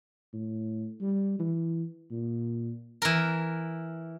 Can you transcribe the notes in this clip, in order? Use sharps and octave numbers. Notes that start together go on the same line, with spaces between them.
A2
G3
E3
A#2
E3 A#4